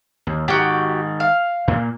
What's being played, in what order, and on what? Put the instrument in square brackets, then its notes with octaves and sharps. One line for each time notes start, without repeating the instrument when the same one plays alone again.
[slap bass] D#2
[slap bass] G#2 D#3 [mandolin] F#4 G4
[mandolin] F5
[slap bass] A#2 A#3